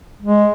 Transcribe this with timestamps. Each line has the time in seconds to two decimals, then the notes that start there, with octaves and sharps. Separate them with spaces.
0.22 G#3